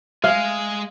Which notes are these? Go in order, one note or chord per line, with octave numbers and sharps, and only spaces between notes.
G#3 G#4 F5